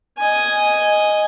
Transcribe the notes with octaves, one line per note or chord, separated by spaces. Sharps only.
D#5 G#5